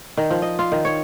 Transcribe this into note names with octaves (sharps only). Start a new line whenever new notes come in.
D#3
F3
D#5
F4
D#3
C#5